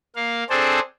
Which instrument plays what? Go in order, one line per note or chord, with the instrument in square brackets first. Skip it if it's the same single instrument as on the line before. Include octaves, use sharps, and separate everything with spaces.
[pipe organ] A#3 F5
C4 D4 G#4 A4 C5